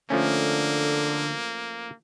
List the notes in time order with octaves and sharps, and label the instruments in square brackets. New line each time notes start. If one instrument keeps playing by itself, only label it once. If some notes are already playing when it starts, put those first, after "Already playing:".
[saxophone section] D3 [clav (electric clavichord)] F3 A3 C#4 [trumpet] A#3